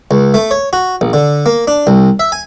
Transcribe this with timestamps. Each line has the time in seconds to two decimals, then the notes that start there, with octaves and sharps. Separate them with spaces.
0.11 C#2
0.34 A3
0.51 C#5
0.73 F#4
1.01 A#1
1.13 D3
1.46 A#3
1.67 D4
1.87 C2
2.19 E5
2.32 G#5